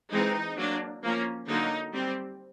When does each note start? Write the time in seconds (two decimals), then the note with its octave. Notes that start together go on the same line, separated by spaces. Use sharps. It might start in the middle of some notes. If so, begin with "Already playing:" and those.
0.11 E3 G#3 C4 D#4
0.57 F#3 A#3 D4
1.03 F3 A#3 C#4
1.48 D3 F#3 A#3 D#4
1.93 G3 C4